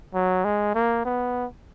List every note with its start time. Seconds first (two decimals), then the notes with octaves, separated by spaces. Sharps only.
0.14 F#3
0.45 G#3
0.75 A#3
1.05 B3